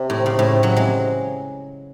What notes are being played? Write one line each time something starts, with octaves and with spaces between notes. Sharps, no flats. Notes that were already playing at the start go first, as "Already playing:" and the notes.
Already playing: C3
A2
C#3
A2
F#3
C3 G#3